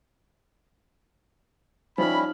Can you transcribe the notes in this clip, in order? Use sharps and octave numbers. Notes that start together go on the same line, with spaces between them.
F3 G3 C#4 D#4 E4 B5 F6